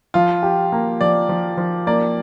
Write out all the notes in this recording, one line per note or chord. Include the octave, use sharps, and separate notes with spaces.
F3 F4
G4
A#3
F3 D5
F3
F3
A#3 D5